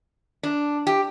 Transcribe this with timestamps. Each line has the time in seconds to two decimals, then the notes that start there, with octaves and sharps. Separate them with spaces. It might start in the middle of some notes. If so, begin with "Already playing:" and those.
0.43 D4
0.87 G4